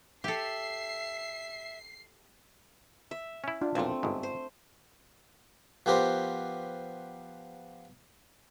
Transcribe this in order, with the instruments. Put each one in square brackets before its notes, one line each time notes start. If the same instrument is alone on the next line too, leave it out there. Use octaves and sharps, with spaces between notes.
[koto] G4 A4 [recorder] E5 [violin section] C7
[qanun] E5
[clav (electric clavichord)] C#4 E4
[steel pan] D4 F4
[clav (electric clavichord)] B1 F2 A#2 [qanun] A3 C4
[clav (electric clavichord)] G1 G#2
[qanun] C5
[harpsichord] F3 B3 G4 A#4 C5